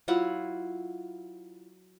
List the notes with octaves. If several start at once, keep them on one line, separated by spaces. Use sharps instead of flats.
F#3 E4 F4 F#5